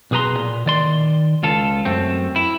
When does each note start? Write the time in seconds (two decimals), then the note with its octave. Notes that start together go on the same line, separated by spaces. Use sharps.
0.11 B1 B2 G#4 B4 A#5 C6
0.37 A#2
0.66 D#3 D5 C6
1.43 C#2 F4 A4
1.85 F#2 A3 C4
2.36 E4